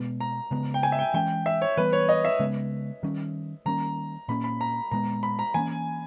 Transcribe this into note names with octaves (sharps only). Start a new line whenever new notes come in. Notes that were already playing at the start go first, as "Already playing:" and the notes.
Already playing: B2 G#3 B3
A#5
C#3 G#3 B3
G5
G#5
E5
G5
E3 G#3 C#4 G5
E5
C#5
E3 G3 B3 B4
C#5
D#5
E5
C#3 G#3 B3
D#3 G3 C#4
D#3 G3 A#3 C#4 A#5
A#2 A#3 C#4 B5
B5
A#5
A#2 G#3 B3 A#5
B5
A#5
E3 A#3 C#4 G#5